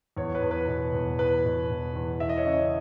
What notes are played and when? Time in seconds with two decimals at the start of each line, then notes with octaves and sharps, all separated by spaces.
0.17 E2 C#5
0.35 B4
0.42 E2
0.51 B4
0.68 B2
0.93 E2
1.19 E2 B4
1.45 B2
1.70 E2
1.96 E2
2.20 E3 E5
2.29 D#5
2.38 C#5
2.46 C#3 D#5